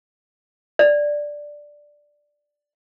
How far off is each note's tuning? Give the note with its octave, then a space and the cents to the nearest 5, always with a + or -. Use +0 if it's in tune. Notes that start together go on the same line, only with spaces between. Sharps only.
D5 +0